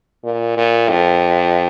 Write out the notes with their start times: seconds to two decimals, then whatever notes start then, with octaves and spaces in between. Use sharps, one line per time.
0.24 A#2
0.57 A#2
0.89 F2